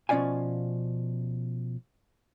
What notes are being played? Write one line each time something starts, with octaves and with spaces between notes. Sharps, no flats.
B2 F3 C#4 D5 F5 G#5